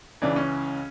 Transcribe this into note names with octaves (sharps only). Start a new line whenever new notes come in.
C#2 C#3 E3 D4
C#4